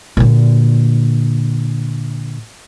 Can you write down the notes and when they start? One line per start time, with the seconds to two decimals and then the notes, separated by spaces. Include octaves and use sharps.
0.17 A#2 D3